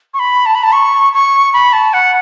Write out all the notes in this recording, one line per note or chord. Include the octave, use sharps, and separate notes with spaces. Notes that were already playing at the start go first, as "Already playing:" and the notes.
C#6
B5
A5
B5
A5
C#6
C#6
B5
A5
F#5